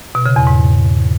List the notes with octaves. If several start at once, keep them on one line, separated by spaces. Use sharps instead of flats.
B2
C#3
E2
G#2